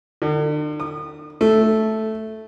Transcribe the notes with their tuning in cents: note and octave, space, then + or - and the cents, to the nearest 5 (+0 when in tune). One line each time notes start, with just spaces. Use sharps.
D3 +45
D#6 -35
A3 -5